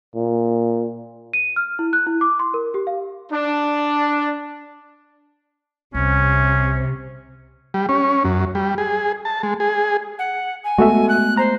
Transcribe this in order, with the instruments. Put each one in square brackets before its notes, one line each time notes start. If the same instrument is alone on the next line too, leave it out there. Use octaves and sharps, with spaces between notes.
[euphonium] A#2
[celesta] D#7
F6
E4
F#6
E4
D6
C6
A#4
G4
F5
[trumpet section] D4
[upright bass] C2 [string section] C3 [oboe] C#4
[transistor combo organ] G3
C#4
F#2
G3
G#4
A5
G#3
G#4
[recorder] F#5
G#5
[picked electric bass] G#3 A3 B3 [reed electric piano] F#4 A4 E5
[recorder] F#6
[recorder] C5 [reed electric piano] A#5